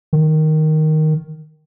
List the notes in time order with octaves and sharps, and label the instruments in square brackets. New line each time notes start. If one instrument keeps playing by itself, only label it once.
[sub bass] D#3